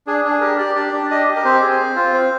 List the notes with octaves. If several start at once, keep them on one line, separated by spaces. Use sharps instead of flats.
D4 G#4
D4 G#4
G4 A#4
G4 D5
D4 D5
D4
G4 D#5
G4
A#4
C4 C5
G#4
C4
F4
C4